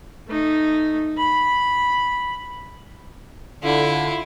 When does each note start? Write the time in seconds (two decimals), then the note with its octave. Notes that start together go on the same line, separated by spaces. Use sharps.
0.28 A3 D#4
1.18 B5
3.63 D3 E4 F4